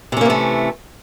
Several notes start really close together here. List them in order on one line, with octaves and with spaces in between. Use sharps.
C3 C#4 A#3 E3 A3